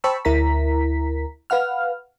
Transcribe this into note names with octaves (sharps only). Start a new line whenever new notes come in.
C5 G5 A5 B5 C#6 E6
D2 E4 A#4 A#5 B6
B4 F5 F#5 F6